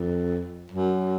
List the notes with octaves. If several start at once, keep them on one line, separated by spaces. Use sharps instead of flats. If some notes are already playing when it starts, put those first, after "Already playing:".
Already playing: F2
F#2